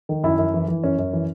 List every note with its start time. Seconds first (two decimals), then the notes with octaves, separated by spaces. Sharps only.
0.09 D#3
0.24 F#2 E4
0.39 F#2
0.54 E3
0.68 E3
0.83 F#2 C#4
0.99 F#2
1.13 E3